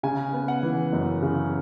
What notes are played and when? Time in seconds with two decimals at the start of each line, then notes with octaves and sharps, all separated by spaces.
0.03 C#3 G#5
0.33 B3
0.48 F#5
0.63 E3
0.93 F#2
1.22 C#3